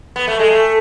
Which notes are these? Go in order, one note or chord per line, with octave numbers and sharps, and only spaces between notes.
B3
A3
G#3
A3